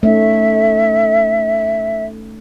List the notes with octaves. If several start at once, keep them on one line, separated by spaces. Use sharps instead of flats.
A3 C#4 D#4 E5